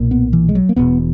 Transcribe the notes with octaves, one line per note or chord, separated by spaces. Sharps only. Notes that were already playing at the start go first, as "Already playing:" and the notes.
Already playing: B1 A#2
B3
E3
G#3
F#3
A#3
E1 E2 B2 B3